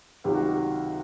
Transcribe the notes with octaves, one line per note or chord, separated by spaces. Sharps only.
C#2 C3 D#3 F#3 G4
F#4
G4